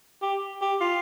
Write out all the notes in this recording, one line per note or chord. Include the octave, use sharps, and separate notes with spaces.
G4
G4
F4